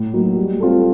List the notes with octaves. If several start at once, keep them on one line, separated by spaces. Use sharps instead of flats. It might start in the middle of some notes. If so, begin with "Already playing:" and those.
Already playing: A2
F#3 A#3 D#4
G3
C4 F4 A4